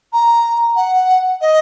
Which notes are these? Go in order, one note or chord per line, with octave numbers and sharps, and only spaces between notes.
A#5
F#5
D#5